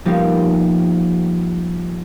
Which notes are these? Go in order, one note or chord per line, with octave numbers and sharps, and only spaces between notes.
F3 G3 A#3 B3 D#4 G4